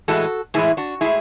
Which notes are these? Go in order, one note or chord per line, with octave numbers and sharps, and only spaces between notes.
A2 E3 G#3 F#4 A4
A2 E3 G#3 E4 G#4
D4 F#4
A2 G#3 E4 G#4